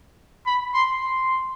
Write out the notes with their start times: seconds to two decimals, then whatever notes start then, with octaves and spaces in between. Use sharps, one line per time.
0.46 B5
0.74 C6
1.02 C6